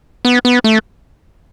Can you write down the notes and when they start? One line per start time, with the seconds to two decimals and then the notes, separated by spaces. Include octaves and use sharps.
0.25 B3
0.45 B3
0.64 A3